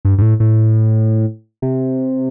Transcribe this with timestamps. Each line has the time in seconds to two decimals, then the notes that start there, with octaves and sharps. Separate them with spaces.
0.05 G2
0.18 G2
0.22 A2
0.40 A2
1.62 C3